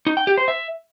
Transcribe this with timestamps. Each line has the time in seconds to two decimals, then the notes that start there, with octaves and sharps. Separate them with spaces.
0.07 D#4
0.17 G5
0.27 G4
0.38 C5
0.48 E5